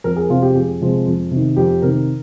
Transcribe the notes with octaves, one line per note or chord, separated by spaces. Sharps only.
F2 A#4
G#4
C3 F3 G#3 C4 F4
G4
F2 G#4
C3 F3 G#3 C4
F2
C3 D#3
F2 G4
C3 D#3 A#4